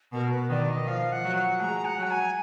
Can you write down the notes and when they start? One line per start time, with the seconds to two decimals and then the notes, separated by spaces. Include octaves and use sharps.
0.12 B2 A#4
0.31 B4
0.49 D#3 D5
0.69 D#5
0.86 F3 F5
1.12 F#5
1.24 F#3
1.36 F#5
1.60 G#3 A#5
1.85 F#5
1.98 F#3
2.03 A#5
2.10 G#5